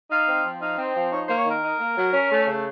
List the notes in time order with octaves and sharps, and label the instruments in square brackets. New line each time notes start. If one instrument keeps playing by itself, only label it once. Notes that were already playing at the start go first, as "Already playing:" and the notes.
[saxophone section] D#4 F5
C4
F3
D#4 F5
C4
F3
D#4 C#5
A#3 C5
C#5
D#3 A#4
D#4
A#3
F#3
C#4
A3
C#3